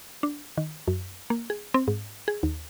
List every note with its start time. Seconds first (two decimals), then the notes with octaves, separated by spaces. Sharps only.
0.23 D4
0.58 D#3
0.88 F#2
1.30 A#3
1.50 G#4
1.74 C4
1.88 G#2
2.28 G#4
2.43 D#2